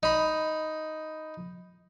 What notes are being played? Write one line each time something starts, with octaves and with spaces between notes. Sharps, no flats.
D#4 B5